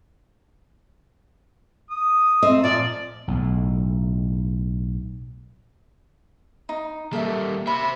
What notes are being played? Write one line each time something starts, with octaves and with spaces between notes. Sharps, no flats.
D#6
C4 D#5 E5
A#2 F3 D5
B1 A2
D#4
G3 A#3 A4 E5
C5 E5 B5